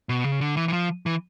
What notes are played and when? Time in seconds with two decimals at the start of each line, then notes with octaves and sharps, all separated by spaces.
0.09 B2
0.24 C#3
0.40 D3
0.57 E3
0.68 E3
0.73 F3
1.06 E3